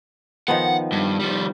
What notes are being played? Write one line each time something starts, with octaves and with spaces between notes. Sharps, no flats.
D#3 F3 B3 F#5
G2
F3 G3